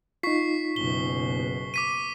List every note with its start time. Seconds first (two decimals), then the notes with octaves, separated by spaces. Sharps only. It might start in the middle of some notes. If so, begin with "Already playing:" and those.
0.23 D#4 F4 C#6 B6 C7
0.76 F#1 B2 G7
1.74 D6 B6 D#7